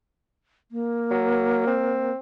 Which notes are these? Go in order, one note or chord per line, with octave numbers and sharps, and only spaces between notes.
A#3
F#3
C4